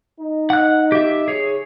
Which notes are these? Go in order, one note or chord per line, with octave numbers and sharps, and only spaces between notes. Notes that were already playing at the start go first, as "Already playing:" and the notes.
D#4
F#5 F#6
G4 E5
G#4 C#5